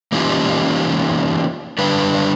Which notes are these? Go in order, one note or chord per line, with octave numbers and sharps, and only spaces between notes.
E3 A#3 C#4 D#4 F4 G4
D3 G3 D4 B4